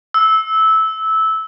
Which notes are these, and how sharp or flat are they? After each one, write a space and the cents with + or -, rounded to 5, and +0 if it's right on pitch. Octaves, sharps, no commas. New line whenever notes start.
E6 -15